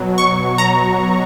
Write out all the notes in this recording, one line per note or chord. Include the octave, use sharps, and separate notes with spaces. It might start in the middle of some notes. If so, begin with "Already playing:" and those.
Already playing: B2 F#3
C#6
A#5